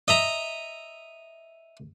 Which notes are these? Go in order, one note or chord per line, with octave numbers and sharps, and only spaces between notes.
D#5 E5 A#5